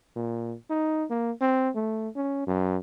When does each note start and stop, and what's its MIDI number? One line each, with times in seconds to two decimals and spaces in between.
0.16 0.55 46
0.70 1.05 63
1.10 1.31 58
1.41 1.70 60
1.76 2.09 57
2.16 2.44 61
2.47 2.77 42